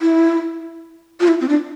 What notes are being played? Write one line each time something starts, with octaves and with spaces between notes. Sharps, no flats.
E4
F4
E4
C4
D4